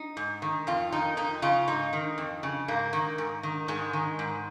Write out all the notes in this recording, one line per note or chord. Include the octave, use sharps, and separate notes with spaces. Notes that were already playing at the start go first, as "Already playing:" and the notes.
Already playing: D#4
G#2
D#3
F2 F4
D#3 D#4
F2 D#4
C#3 F4
G#2 D#4
D#3
F2
C#3
G#2 A#3
D#3
G#2
D#3
G#2 G#3
D#3
G#2